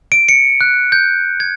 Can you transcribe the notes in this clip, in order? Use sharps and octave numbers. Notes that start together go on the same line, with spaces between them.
D7
C#7
F#6
G6
G#6